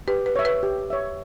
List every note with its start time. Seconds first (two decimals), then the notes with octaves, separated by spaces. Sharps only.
0.08 G4 B4
0.26 B4
0.36 C#5 E5
0.45 B4
0.63 G4
0.90 C#5 E5